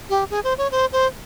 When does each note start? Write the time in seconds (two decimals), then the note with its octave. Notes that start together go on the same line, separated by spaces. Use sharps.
0.10 G4
0.30 G#4
0.44 C5
0.58 C#5
0.71 C5
0.93 C5